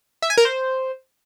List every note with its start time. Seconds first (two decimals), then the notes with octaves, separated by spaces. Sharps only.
0.22 E5
0.30 G#5
0.38 A#4
0.45 C5